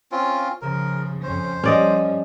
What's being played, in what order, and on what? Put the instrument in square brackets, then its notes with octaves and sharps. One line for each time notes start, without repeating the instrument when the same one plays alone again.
[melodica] C4 C#4 F4
[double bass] C#3 F3 [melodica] A#4
[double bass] F2 C#4 [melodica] C5
[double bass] F3 G3 [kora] C#4 D5 D#5